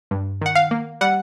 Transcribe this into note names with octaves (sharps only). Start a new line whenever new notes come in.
G2
D#3 F#5
F5
A#3
G3 F#5